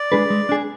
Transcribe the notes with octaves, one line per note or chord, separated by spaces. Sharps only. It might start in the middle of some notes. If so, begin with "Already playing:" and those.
Already playing: D5
G#3 D4 G#4 B4
G#3
D4 G#4